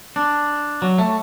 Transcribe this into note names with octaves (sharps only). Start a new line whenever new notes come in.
D4
F#3
A3